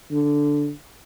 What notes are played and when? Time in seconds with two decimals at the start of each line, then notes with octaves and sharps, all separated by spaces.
0.12 D3